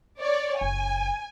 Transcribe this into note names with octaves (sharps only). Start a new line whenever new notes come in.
C#5 D5
F#1 G#5